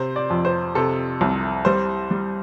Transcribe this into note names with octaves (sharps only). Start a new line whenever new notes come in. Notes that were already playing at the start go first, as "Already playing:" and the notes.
Already playing: C3 C5
D5
F2
C5
C3 A4
C2
G3 C5
G3